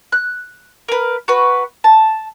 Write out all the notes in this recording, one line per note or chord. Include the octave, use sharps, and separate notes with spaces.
F#6
A#4 B4
F#4 B4
A5